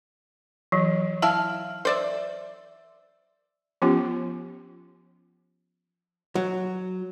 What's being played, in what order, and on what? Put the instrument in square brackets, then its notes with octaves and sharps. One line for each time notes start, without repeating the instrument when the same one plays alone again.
[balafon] E3 F#3
[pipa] E4 E5 F5 [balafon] A5
[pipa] C5 D5 E5
[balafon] F3 B3 C#4 F4 G4
[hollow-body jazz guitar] F#3